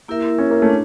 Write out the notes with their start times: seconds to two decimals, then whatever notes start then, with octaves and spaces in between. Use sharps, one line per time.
0.08 A#3 E4 G4 A#4 E5
0.38 C#4
0.50 A#3
0.62 A3 C#4
0.69 D4